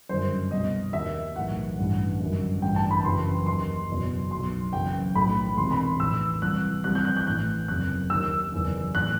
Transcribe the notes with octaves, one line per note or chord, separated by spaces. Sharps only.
G1 F#2 D#3 C5
C2 B2 D#5
D#2 D#3 E5
B1 A2 E3 F#5
A1 G2 E3
G1 F#2 D#3
A1 G2 E3 G5
A5
B5
F#1 F#2 E3 C6
D#2 D#3 C6
F#1 E2 B2
B1 B2 C6
F#1 F#2 E3 G5
B1 A2 E3 B5
E1 E2 C3 D#3 C6
B5
A1 A2 E3 E6
C2 C3 E3 F#6
C2 C3 E3 F#6
G6
F#6
G6
A1 A2 E3 F#6
F#1 E2 C3 F#6
D#2 D#3 E6
F#1 E2 D#3
A2 E3 F#6